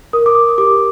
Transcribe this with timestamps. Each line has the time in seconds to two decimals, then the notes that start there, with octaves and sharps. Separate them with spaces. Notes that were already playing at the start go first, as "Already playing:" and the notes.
0.13 A#4 D#6
0.26 D6
0.35 D#6
0.49 D#6
0.58 G4 D6